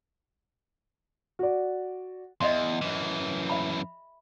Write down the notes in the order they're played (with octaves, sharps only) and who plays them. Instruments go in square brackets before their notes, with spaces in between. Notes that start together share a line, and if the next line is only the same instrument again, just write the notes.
[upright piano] F#4 D5
[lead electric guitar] E2 [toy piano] D#5 E5 C6
[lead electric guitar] F#2 E3
[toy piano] E5 B5